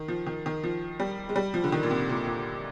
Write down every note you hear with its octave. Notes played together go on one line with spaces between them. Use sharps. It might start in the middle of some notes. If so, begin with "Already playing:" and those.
Already playing: D#3
F3
D#3
D#3
F3
G3
G#3
G3
F3
D3
D#3
A#2
C3
A#2
A#2